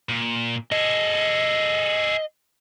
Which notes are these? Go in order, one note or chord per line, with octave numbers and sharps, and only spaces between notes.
A#2
G#4 A4 D#5